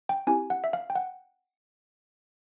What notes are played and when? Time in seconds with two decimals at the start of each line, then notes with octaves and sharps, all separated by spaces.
0.09 G5
0.27 C4 E4 G4 G#5
0.50 F#5
0.64 E5
0.73 F5
0.90 G5
0.95 F#5